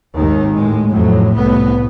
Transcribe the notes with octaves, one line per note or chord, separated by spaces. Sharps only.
G#1 D#2 D#3
A2 G#3
F2 A2 F#3
C2 A2 B3